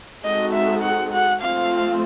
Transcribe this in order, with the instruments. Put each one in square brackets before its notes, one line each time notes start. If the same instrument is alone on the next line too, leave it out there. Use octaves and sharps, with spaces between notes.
[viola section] G#3 C4 D#4 F#4 A4 [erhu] D#5
[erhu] E5
F#5
F#5
[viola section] F3 A3 C4 F4 [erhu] F5